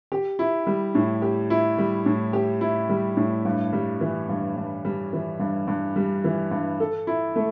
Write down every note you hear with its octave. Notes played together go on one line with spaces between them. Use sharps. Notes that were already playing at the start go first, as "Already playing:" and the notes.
G4
E4
G3
A2
G4
E4
G3
A2
G4
E4
G3
A2
G2
G3
E3
G2
G2
G3
E3
G2
G2
G3
E3
G2
A4
E4
A3